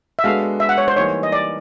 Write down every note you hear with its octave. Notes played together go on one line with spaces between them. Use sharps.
E5
G#3 B3 D4 F#4 A4 F5
E5
F#5
C#5
C5
E3 G3 A#3 D#4 C#5
D#5
D5